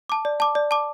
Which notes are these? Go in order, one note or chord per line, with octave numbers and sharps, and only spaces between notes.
A5 D6
D5
A5 D6
D5
A5 D6